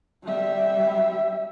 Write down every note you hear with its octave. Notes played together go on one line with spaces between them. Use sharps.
G3 E5